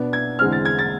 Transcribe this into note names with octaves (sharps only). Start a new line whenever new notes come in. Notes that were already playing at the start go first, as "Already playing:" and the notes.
Already playing: B2 B3 D4
G#6
E2 D3 G#3 C4 F6
A6
G#6
A6